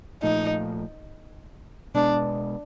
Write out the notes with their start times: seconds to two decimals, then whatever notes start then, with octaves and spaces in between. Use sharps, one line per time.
0.23 A#2 F3 A3 D#4
1.94 B2 G#3 B3 D4